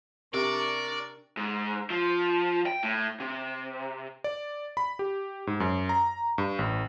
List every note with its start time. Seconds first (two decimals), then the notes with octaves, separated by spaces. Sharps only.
0.34 C3 D4 A#4 D5 C#6
1.37 G#2
1.90 F3
2.66 G5
2.83 A2
3.20 C3
4.24 D5
4.77 B5
4.99 G4
5.47 G#2
5.60 F#2
5.89 A#5
6.38 G2
6.59 A1